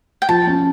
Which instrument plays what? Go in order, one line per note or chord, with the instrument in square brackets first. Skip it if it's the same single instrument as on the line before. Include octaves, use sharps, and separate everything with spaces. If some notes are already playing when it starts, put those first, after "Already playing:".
[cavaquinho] G5
[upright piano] F3 [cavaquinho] A5
[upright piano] C#4